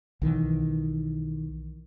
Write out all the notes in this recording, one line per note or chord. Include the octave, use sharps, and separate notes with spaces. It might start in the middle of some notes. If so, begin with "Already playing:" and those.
B1 D#3 E3